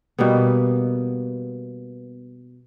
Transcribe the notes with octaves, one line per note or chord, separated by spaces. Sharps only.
B2 G3 A#3 B3